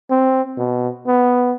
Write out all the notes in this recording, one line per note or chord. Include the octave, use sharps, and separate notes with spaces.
C4
B2
B3